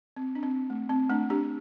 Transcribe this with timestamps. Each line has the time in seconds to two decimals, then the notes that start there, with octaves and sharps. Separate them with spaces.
0.17 C4
0.35 D4
0.43 C4
0.70 A3
0.89 C4
1.10 A3 D4
1.30 D4 G4